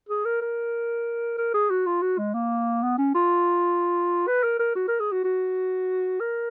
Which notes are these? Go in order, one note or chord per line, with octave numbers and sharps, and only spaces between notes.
G#4
A#4
A#4
A#4
G#4
F#4
F4
F#4
G#3
A#3
B3
C#4
F4
B4
A#4
A#4
F#4
A#4
G#4
F#4
F#4
A#4